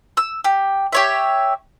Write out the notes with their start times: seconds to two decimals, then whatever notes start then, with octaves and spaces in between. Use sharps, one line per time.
0.17 E6
0.44 G4
0.93 G4 C#5 E5